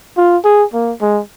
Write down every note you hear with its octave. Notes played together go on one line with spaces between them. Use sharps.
F4
G#4
A#3
G#3